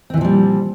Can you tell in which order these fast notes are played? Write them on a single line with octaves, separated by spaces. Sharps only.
C4 E3 A#2 F3 G3